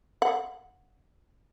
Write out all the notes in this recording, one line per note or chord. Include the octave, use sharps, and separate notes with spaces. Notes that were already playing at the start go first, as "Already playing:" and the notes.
F#5